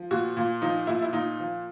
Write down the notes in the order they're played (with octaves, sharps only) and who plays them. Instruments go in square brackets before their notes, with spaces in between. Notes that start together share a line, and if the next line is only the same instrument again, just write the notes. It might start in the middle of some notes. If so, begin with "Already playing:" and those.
Already playing: [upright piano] F3
A#2 F#4
A#2
F3 D#4
A#2 E4
E4
A#2 D#4
F3